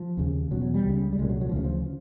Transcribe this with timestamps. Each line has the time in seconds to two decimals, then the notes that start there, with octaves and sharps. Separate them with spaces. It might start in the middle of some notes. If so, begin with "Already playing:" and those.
Already playing: F3
0.17 D#2 C#3
0.51 B2 F#3
0.54 E2
0.62 F#3
0.74 G3
0.85 C#2 C#3
1.13 G3
1.19 C2 G#3
1.22 A#2
1.29 F#3
1.41 F#3
1.49 F3
1.52 D2 C#3 E3
1.64 F3